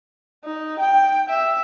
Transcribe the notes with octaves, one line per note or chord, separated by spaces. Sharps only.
D#4
G5
E5